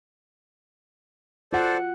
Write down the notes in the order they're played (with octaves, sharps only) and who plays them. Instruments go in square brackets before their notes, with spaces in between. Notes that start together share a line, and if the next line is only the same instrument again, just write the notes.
[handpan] F4 F#5 [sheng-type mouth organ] A4 C5 D5